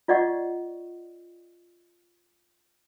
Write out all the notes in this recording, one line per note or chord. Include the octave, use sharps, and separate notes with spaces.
F4 D5 D#5 F#5 C#6